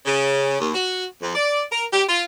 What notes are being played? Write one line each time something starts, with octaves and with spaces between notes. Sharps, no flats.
C#3
D#2
F#4
F2
D5
A#4
G4
F4